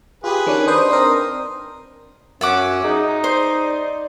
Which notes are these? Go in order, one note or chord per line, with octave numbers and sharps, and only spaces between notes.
F4 G4 G#4 B4
D#3 C#4 D4
D4 D#4 B4 C5 C6 D#6
C4 D4 A#4
F#2 C#4 E5 F#5 D6
D#4 G#4
C5 D5